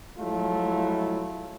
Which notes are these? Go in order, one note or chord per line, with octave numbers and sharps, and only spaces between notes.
F3 F#3 G#3 A3 E4 F4